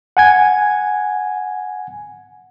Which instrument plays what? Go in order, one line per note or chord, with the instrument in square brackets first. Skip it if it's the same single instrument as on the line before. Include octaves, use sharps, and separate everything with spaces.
[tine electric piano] F#5 G#5 G#6